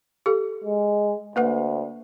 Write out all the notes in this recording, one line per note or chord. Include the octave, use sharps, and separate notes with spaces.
G4 A4
G#3
D2 A#3 B4 F#5